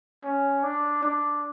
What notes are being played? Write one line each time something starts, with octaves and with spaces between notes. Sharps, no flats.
C#4
D4
D4